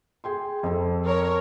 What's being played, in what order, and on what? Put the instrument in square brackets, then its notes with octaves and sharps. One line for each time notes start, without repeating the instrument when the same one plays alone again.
[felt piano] G#4 G5 C6
F2 A4
[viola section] A#4 C#5